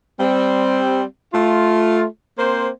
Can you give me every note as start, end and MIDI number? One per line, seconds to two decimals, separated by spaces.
0.20 1.04 55
0.20 1.04 60
1.34 2.05 57
1.34 2.05 65
2.39 2.69 58
2.39 2.69 60
2.39 2.69 72